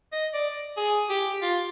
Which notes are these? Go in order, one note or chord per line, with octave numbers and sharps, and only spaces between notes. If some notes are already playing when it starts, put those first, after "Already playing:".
D#5
D5
G#4
G4
F4